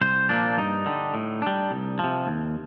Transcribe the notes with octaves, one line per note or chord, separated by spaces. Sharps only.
C2 C5
A#2 F3 A#3 D4
G2 D#4
D3 G3
A2
G3 D4
C2
C3 F3
D#2